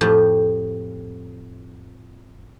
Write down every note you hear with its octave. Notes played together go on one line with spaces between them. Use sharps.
F2 A2 F3 G4